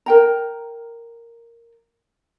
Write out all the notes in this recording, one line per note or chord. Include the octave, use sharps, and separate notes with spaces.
A#4 G5 A#5